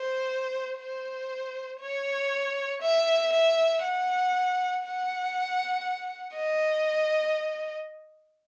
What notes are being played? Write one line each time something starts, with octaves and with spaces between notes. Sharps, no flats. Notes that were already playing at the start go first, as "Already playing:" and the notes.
Already playing: C5
C5
C#5
E5
E5
F#5
F#5
D#5